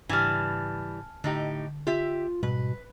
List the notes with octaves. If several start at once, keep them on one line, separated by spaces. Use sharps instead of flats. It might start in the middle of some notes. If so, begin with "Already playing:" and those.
G#2 C#3 E3 G3 D4 G#5 A5 F6
A2 D3 D#4 G4
F4 G4 E5
G#2 B2 G3 B4